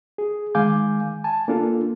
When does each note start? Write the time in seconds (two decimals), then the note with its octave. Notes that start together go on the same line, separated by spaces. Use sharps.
0.18 G#4
0.55 D#3 G#3 F5 G#5 D6 G6
1.24 G#5 A5
1.48 A#3 D4 F4 A4